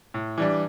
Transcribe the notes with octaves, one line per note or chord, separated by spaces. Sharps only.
A2
E3 G3 D4